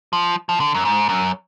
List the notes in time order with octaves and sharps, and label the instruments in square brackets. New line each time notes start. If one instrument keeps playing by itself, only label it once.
[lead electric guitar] F3
F3
D3
F#2
G#2
F#2